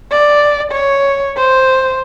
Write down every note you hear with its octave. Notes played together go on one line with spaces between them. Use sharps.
D5
C#5
C5